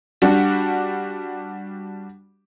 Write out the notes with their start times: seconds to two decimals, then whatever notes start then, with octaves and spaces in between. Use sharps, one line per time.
0.22 G3 D4 F#4